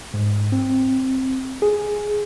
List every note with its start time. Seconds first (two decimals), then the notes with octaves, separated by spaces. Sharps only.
0.14 G#2
0.52 C4
1.62 G#4